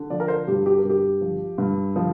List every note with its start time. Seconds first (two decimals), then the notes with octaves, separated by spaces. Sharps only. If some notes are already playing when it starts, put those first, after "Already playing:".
Already playing: D3
0.10 F3 D5
0.20 A#4
0.28 C5
0.48 G2 G4
0.66 G4
0.78 A#4
0.84 G2
0.90 G4
1.21 F3
1.58 G2
1.96 F3